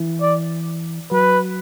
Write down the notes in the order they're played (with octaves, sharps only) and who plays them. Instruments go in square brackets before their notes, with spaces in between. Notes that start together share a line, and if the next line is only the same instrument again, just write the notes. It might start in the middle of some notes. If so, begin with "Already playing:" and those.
Already playing: [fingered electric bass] E3
[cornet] D5
[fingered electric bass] F#3 [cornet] B4